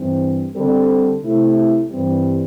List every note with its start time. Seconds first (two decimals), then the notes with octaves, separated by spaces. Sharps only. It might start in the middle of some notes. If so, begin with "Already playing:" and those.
Already playing: G2 E3 C4
0.54 D3 G3 C4 A4
1.22 C3 A3 E4
1.91 G2 E3 G3 C4